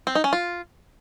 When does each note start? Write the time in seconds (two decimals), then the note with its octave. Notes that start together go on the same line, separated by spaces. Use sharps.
0.07 C4
0.15 D#4
0.24 C#4
0.33 F4